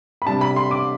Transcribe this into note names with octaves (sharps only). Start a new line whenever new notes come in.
B5
C3 G3 D4 A5
B5
C6
D6